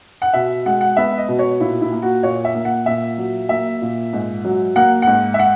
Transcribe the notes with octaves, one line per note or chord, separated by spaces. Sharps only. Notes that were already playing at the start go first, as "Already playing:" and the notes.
F#5
B2 E5
G#3 F#5
F#5
B3 E5
D#5
B2
C#5
A#2 E4
E4
A#3
F#4
A#2 C#5
E5
A#3
F#5
A#2 E5
F#3
A#3 E5
A#2
G#2
F#3
A#3 F#5
G#2 F#5
E5
F#5